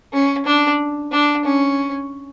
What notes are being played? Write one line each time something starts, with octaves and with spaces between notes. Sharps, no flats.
C#4
D4
D4
C#4